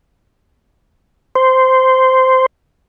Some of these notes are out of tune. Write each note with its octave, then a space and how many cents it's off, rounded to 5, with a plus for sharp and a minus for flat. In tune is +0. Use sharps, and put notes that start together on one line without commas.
C5 -10